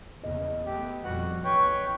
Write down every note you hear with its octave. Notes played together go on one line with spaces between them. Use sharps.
E2 A#2 C#3 D#5
A3 B3 G4
F2 B2 G3 F#4 F#5
A1 E2 E3 B4 C#5 G5 C#6